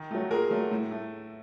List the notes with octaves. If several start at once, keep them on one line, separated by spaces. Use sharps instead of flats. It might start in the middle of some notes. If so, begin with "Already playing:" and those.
Already playing: D#3
F#3 A3
A#2 G#4 A#4
F#3 A3
A2
A3